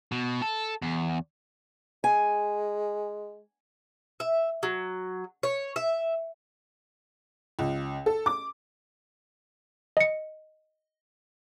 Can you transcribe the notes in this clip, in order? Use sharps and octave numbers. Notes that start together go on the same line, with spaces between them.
B2
A4
E2
G#3 G#5
E5
F#3
C#5
E5
C#2
A4
D6
D#5 C#7